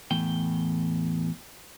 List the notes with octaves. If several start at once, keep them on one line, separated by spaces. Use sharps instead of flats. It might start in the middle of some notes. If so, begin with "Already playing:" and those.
E2 A2 G5